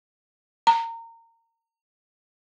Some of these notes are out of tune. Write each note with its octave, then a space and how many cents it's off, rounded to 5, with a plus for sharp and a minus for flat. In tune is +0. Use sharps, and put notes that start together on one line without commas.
A#5 -25